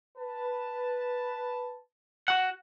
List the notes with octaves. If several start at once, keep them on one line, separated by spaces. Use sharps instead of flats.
B4 A5
F#4 F#5